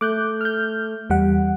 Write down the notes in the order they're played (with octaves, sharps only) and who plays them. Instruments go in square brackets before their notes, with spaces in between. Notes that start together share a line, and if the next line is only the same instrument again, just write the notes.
[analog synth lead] A3 [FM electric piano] D6 F#6 G6
[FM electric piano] F6 G6
E2 G3 F#5